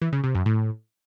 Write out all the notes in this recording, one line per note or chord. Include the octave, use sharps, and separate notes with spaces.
E3
C#3
C3
F#2
A2